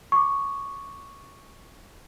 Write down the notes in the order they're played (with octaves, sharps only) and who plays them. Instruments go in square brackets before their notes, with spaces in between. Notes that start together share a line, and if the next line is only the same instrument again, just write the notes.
[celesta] C#6 D6